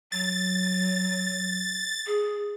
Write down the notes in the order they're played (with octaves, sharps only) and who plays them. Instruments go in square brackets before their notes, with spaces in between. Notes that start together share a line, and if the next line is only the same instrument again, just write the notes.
[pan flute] F#3 [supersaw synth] A6
[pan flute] G#4